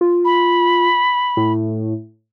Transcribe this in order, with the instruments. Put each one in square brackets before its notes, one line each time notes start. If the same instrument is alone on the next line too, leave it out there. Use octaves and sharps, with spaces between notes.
[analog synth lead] F4
[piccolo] B5
[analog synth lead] A2